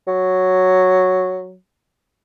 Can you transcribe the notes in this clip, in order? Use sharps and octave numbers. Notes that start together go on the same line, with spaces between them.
F#3